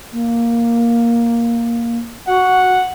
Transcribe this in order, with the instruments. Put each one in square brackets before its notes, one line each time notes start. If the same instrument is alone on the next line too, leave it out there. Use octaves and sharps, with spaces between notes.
[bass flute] A#3
[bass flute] F#4 [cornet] F#5